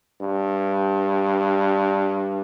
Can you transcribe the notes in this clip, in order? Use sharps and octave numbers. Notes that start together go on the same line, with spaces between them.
G2